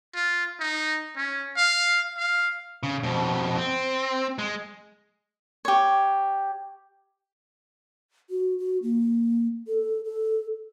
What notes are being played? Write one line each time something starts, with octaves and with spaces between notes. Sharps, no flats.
F4
D#4
C#4
F5
F5
C#3
F2 B2
C4
G#3
G4 C#5
F#4
F#4
A#3
A4
A4